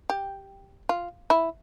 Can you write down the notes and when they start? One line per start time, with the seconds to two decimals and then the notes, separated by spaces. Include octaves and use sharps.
0.10 G4
0.89 F4
1.30 E4